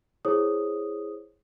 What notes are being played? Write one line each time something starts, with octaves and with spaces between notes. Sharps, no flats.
E4 G#4 C5 C#5 D#6